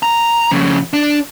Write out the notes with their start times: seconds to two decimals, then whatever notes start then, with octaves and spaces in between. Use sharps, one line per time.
0.03 A#5
0.51 F2 C#3
0.93 D4